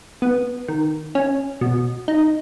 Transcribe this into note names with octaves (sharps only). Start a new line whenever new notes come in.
B3
D#3
C#4
B2
D#4